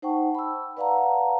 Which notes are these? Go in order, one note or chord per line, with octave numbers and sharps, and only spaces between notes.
D#4 C5 F#5 G5 A5 C#6
B5 E6
B4 D5 F5 F#5 A5 A#5